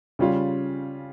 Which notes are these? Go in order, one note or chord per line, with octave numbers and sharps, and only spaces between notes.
C#3 G3 C#4 F4